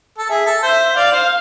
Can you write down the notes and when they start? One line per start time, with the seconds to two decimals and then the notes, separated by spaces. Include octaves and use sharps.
0.18 A4
0.29 G#4 E5
0.46 A4
0.63 C5 E5
0.96 D5 F5
1.12 C5